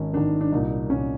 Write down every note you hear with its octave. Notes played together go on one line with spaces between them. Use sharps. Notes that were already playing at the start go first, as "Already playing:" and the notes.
Already playing: G#1 G#2 D#3 C#4
G#1 G#2 D#3 D4
D4
C2 A#2 D#4
C2 A#2 C#4